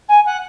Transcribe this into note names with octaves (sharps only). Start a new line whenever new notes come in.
G#5
F#5